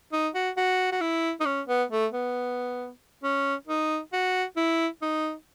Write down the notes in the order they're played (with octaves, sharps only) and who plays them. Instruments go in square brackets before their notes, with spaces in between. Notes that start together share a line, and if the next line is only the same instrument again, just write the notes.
[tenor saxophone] D#4
F#4
F#4
F#4
E4
D#4
C#4
B3
A3
B3
C#4
D#4
F#4
E4
D#4